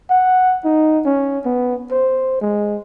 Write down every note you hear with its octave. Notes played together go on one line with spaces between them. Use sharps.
F#5
D#4
C#4
B3
C5
G#3